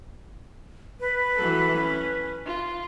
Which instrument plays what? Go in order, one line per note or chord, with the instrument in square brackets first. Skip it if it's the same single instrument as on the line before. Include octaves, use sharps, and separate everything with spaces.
[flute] B4
[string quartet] E3 F#3 A4
C#4
F4